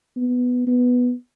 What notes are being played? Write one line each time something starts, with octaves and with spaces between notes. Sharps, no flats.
B3
B3